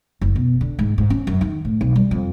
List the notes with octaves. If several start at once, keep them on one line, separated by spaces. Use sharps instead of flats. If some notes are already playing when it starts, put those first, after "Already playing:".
F#1
B2
D3
G#2
G#2
C#4
F#2
D#3
A2
B1
G3
F2